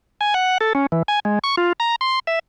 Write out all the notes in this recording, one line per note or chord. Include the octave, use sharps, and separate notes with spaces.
G#5
F#5
A4
C#4
E3
G#5
G#3
C#6
F4
A#5
C6
E5